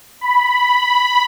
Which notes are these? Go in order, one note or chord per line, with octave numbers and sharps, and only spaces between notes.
B5